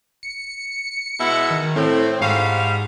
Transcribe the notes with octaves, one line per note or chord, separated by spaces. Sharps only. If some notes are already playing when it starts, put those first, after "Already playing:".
C#7
B2 G#3 E4
D#3
A2 C4
G#2 G3 F#4 F5